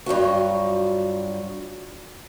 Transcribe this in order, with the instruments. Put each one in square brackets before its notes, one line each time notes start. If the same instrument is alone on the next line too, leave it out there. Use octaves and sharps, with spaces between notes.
[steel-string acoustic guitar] G2 F#3 F4 F#4